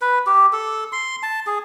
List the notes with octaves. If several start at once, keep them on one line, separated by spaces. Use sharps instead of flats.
B4
G4
A4
C6
A5
G#4